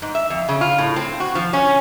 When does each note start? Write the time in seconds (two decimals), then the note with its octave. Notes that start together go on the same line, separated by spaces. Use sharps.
0.02 G#2
0.15 E5
0.30 F2
0.49 C#3
0.61 F4
0.78 A2
0.96 C4
1.20 F#4
1.35 F3
1.53 C#4